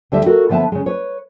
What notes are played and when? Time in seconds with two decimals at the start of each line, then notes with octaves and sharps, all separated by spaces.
0.12 D2 D3 G3 E5
0.26 F#4 A4 A#4
0.49 D3 F3 B3 E5 A5
0.72 C#3 G#3
0.86 B4 C#5